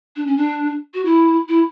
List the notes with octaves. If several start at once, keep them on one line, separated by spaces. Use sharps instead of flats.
D4
C#4
D4
F#4
E4
E4